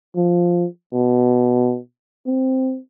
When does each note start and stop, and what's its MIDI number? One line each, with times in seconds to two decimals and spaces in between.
0.16 0.66 53
0.93 1.78 47
2.26 2.79 60